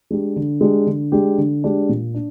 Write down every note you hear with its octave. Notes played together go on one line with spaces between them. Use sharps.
G#3 D4 G4
D3
G#3 D4 G4
D3
G#3 D4 G4
D3
G#3 D4 G4
A#2
D4